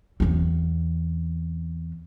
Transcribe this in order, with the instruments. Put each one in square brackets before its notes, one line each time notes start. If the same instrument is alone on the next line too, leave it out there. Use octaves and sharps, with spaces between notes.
[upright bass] E2 C4